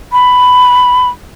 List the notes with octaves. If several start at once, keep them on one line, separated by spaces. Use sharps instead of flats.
B5